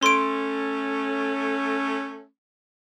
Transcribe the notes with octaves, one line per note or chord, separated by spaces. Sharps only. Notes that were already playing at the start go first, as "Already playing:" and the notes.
A3 C#4 C6 D7